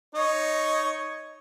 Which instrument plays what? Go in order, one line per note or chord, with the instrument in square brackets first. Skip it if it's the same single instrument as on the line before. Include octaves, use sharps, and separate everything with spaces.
[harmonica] D#4 C#5